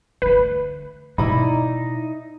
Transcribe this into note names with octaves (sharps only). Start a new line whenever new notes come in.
D3 A3 B4
B2 D#4 E4 D5 B5